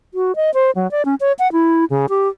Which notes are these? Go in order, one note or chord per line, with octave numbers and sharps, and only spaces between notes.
F#4
D#5
C5
F#3
D5
C#4
C#5
F#5
E4
C#3
G4